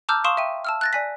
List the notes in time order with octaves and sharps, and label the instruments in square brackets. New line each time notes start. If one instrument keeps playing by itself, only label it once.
[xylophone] A5 A#5 D6 E6 F6 G6
F5 C6 C#6 D#6 E7
E5 G5 D#7
A5 E6 F6
F#6 A6 A#6
D5 G#5 B6